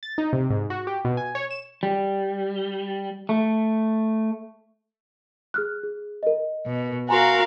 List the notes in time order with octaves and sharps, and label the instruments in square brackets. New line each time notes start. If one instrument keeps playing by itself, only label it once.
[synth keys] A6
D#4
C3
G#2
F#4
G4
B2
G#5
C#5
E7
[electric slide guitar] G3
A3
[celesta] G#4 F6 F#6
G#4
A#4 D#5
[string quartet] B2
[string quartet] F#4 A#4 F5 [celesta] G#5 A#5 C6